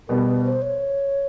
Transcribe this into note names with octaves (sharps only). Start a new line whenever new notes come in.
B2 G3 B3 A#4
B4
C5
C#5